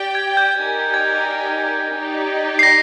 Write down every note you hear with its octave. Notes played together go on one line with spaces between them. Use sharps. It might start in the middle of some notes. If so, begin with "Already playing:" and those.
Already playing: G4 D5 G5
G#6
G6
D#4 G4 A#4 D5 G#5
G#6
D#4 G4 D5
C7
A#6